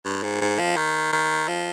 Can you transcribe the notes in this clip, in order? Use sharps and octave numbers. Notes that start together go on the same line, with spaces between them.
G2
G#2
G#2
F3
D#3
D#3
F3